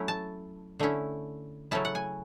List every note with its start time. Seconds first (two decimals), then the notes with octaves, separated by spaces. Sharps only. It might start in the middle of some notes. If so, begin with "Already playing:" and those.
Already playing: F#3 A3 C#4 E4
0.08 A5
0.79 D3 A3 C#4 E4
1.71 C#3 F#3 A3 C#4 E4 A5
1.85 F#5
1.95 G#5